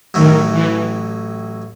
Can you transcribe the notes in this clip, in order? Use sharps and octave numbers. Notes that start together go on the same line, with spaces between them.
A1 A2 D#3 F#3 A3
E3